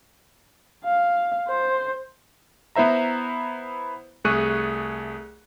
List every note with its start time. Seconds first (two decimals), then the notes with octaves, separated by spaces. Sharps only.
0.85 F5
1.48 C5
2.76 B3 E4 C5 E5 A#5
4.25 C2 A3 G#4 C#6 F#6 D#7